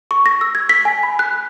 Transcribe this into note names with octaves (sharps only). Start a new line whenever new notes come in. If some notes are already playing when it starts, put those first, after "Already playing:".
C#6
A#6
E6
G#6
B6
G#5
B5
F#6